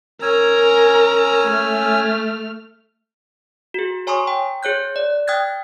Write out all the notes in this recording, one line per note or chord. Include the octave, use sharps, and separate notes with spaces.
C#4 A#4 G#5 A#5 E6
A3 F6
F#4 G#4
C#5 G#5 A#5 C6 C#6 D#6
G5
G#4 C#5 F#6 G6
D5
G5 D#6 F6 F#6 G#6 A6